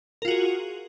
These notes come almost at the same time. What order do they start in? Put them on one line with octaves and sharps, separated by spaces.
A#4 F4 F#4 G#4